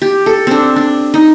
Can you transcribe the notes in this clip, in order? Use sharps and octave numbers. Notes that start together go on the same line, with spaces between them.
G4
A4
C4 D4
D4
D#4